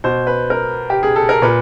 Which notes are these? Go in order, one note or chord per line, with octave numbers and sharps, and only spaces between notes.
B2 C5
B4
A#4
G4
G#4
A4
A#4
A#2 B4